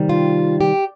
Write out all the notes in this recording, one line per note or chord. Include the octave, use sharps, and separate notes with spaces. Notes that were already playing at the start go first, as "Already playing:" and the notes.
Already playing: C3 D#3 G3
F4
G4